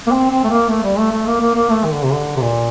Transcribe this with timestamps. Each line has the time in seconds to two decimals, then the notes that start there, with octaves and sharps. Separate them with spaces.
0.07 A#3
0.12 C4
0.31 C4
0.44 A3
0.50 A#3
0.69 A3
0.84 G3
0.98 A3
1.12 A3
1.27 A#3
1.41 A#3
1.55 A#3
1.69 A3
1.85 D#3
1.94 D3
2.03 C3
2.12 D3
2.36 C3
2.41 A#2